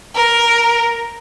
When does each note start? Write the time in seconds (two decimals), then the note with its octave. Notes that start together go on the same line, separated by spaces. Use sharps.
0.15 A#4